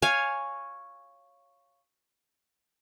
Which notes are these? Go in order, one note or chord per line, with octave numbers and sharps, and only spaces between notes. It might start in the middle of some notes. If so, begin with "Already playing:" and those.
C#5 F5 G#5